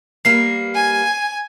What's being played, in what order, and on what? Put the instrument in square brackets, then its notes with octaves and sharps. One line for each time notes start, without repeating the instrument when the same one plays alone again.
[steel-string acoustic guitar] G3 A#3 B4 [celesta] C7
[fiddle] G#5